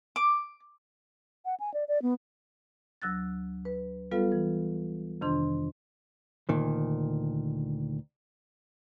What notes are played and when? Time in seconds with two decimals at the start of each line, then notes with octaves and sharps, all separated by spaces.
0.16 D6
1.45 F#5
1.60 G#5
1.74 D5
1.88 D5
2.02 B3
3.02 D2 F#3 E6 F#6 A6
3.65 B4
4.11 G3 B3 F4 A4 B4 F5
4.32 E3
5.21 F2 C3 D#3 D4 C6
6.49 D2 A#2 D#3